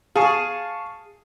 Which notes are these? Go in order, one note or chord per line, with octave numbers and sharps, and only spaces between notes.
G#4 F5 A5 C#6